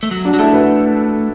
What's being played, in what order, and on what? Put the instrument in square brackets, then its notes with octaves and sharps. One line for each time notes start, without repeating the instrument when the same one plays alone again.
[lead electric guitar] A3
F#3
[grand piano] D4 F#4
[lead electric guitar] F#3
[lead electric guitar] A3 [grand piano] E4 A4
[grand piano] F#4 B4